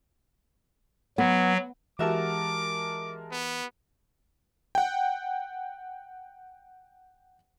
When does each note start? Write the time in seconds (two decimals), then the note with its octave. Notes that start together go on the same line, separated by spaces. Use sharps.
1.18 F#3 B3
1.99 E3 G#3 F#4 G4 A#4 E5 A5 D6
3.31 B3
4.75 F#5 G5